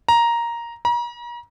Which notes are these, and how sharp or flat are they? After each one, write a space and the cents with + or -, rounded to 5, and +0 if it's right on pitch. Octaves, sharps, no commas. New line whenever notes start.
A#5 +5
A#5 +40